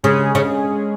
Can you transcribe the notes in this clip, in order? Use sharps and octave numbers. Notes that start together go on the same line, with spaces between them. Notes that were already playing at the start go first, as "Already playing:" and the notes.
C#3 G#3 C#4 G#4
C#3